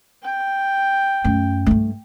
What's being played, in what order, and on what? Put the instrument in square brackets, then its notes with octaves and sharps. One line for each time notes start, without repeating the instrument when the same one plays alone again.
[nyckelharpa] G5
[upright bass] F#2 A3
G2 A3